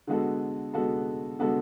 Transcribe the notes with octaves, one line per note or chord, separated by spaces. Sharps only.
D3 G#3 B3 F#4 A4
D3 G#3 B3 F#4 A4
D3 G#3 B3 F#4 A4